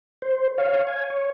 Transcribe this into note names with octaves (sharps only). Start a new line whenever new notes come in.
C5
C#5 F5
G#5
C#5